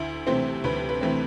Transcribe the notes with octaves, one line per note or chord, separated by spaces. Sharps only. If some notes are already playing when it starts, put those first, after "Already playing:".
Already playing: D2 E4 E5
C3 E3 A3 C4 C5
D2 B4
B4
C3 E3 A3 C4